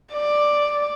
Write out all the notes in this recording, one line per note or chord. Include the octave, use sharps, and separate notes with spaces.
D5